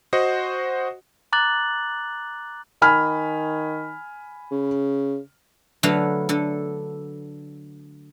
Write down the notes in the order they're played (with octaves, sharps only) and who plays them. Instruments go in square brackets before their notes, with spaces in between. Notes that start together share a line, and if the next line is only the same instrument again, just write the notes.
[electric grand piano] F#4 C5 D#5 F#5
[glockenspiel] A#5 D6 F#6 A6 F#7
[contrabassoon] D#3 [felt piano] G#5 B5 F6
[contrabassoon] C#3
[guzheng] D3 F#3 A3 A4 B4 F5
D3 A4